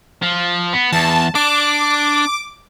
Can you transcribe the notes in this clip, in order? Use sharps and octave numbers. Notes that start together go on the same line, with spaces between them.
F3
B3
E2 A5
D4 D6